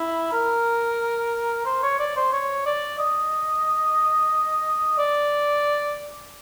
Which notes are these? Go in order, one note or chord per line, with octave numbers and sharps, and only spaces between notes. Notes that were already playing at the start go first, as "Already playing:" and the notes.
Already playing: E4
A#4
C5
C#5
D5
C5
C#5
D5
D#5
D5